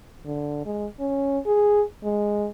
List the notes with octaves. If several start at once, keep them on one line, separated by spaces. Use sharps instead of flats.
D3
G#3
C#4
G#4
G#3